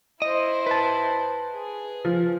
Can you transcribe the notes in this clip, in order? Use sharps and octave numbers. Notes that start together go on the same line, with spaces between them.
E4 C5 D#5
B4 A5
G#4
F3